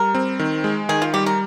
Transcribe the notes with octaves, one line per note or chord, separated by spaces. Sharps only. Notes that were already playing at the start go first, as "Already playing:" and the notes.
Already playing: G3 A#4
C4
D#3
G#3
D#3 G#4
F4
G3 G4
A#4